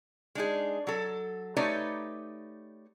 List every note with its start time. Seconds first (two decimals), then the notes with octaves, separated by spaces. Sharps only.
0.35 G#3 D4 D#4 G#4
0.87 F#3 A4
1.57 A3 D#4 G4 B4 C#5 D5